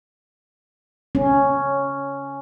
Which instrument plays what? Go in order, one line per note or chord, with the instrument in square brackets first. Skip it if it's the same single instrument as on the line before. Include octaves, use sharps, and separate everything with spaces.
[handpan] C#4